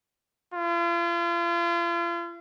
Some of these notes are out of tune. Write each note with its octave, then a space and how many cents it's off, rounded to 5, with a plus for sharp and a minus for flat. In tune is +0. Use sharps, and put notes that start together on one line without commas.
F4 -40